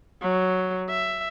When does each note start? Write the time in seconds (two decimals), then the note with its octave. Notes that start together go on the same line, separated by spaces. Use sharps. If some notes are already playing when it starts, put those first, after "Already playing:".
0.22 F#3
0.90 E5